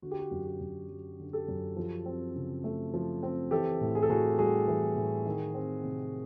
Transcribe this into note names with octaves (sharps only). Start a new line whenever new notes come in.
D3 F#4
G4
F#4
F#2
G4
F#2
F#3
D3
G4 A4
F#2
F3
C4
C#3
A3
F3
C4
E3 G4 A4
A2
G#4
A4
A2 F#4 G#4
G3 F#4 G#4
E3
A2
D#3
C4
C3